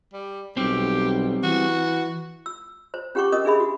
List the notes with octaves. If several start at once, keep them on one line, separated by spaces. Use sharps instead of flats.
G3
B1 G3 C4 G4
E3 F#4
E6
C5
C#4 G4 F#5 G5 C#6 D6
C#4 A#4 D#5 D#6
D4 G#4 E5 B5
F#4